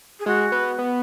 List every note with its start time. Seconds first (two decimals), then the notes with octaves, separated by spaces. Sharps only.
0.19 G#4
0.26 G#3 F#4
0.52 B3
0.79 B3